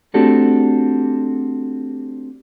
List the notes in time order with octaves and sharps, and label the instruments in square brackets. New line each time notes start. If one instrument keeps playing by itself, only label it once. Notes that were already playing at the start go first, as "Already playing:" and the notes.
[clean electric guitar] A3 C4 D4 F#4 G4 A4